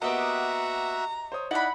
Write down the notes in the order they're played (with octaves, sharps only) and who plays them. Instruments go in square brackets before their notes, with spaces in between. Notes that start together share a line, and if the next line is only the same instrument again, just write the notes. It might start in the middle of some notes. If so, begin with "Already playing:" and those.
[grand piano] A#3 B3 [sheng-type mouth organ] F#4 E5 F#5 [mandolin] G4 D#5 [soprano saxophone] A#5
[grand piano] C5 C#5 D#6
[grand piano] D#4 D5 [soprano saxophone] E4 [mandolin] F#5 B5